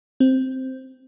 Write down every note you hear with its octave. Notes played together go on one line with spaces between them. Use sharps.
C4